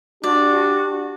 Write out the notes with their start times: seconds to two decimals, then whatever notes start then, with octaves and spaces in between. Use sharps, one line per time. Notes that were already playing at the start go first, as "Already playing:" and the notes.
0.24 D4 F#4 G4 D5